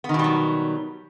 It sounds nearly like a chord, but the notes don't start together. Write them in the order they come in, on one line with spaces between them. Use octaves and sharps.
B3 D#3 B2 G3 F#3